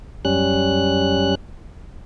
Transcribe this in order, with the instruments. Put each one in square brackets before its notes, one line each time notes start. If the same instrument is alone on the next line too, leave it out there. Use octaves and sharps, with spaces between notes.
[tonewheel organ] F#2 G3 C#4 F#6